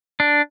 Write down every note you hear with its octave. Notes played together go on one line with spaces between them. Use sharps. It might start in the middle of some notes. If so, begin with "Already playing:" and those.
D4